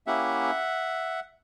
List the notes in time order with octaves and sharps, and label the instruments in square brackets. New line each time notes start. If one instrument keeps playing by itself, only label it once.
[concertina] A#3 C#4 E4 G4 E5 F#5